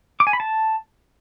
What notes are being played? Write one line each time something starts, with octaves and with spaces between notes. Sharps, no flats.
D6
G#5
B5
A5